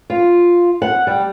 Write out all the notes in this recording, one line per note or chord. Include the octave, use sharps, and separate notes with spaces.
F4
F#5
G3